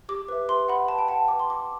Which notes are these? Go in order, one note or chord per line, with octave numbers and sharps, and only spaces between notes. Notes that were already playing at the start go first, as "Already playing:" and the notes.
G4 D6
B4 E5
B4 C6
F#5 B5
B4 A5
G5
F#5 A5
B4 D6
C6
F#5 D6